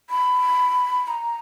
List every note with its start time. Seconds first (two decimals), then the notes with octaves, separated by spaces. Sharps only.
0.10 B5
1.08 A#5